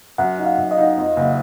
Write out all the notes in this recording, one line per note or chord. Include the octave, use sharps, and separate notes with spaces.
F#2 F#5
D#4
F5
F#2
D#5
D#4
F2
F#1